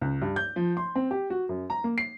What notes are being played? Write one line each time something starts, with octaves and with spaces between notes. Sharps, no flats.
C#2
G2
G6
F3
C6
C4
G4
F#4
F#2
A#5
A#3
C7